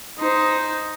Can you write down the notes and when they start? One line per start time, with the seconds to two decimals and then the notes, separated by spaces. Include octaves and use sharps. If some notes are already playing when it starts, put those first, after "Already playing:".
0.18 D#4 C5